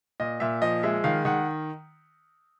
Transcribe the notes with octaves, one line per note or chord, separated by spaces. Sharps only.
A#2 D#5
A#2 E5
F3 D#5
G#3 E5
D#3 F5
D#3 F#5